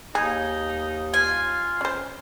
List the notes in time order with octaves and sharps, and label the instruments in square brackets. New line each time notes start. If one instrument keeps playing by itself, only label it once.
[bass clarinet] D#2 [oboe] D#4 [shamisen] G#4
[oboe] F4 [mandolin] G#5
[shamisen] C#4 C5